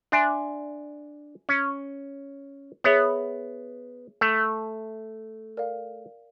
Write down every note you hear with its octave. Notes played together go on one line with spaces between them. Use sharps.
D4 E5 G#5 C6
C#4
B3 G#4 C#5 E5
A3
A#4 D5 F5